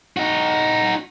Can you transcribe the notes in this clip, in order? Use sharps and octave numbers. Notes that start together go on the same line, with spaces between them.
D#4 F#4